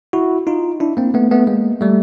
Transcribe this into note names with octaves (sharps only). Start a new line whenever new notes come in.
E4 F#4
D#4 F4
D4 E4
A#3 C4
A3 B3
A3 B3
G#3 A#3
G3 A3